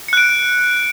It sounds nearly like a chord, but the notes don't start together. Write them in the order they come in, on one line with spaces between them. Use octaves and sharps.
C#7 F#6 D7